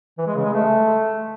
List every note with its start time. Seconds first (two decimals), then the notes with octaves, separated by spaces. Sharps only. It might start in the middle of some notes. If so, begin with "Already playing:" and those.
0.18 E3
0.27 G#3
0.36 C#3
0.45 G#3
0.53 A3